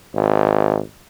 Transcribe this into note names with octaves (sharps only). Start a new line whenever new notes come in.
G#1